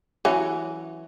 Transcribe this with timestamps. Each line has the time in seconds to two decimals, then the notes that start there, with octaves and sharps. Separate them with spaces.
0.25 E3 F#3 C#4